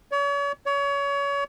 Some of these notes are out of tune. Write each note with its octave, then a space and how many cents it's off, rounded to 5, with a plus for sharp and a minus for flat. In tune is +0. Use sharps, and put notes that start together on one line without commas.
C#5 +40
C#5 +30